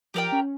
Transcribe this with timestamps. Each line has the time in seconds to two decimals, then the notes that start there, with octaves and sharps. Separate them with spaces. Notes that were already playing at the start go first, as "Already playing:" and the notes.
0.14 F3 G4 A#4 D5 G5
0.32 C#4